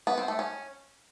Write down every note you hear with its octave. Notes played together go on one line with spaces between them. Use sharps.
B3
C4
A3
C#4